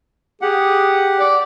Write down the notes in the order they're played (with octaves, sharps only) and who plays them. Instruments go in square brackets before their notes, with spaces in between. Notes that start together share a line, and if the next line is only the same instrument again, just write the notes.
[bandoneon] G4 F#5 [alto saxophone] G#4
[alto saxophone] D5